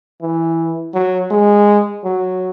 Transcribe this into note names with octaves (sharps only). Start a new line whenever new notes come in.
E3
F#3
G#3
F#3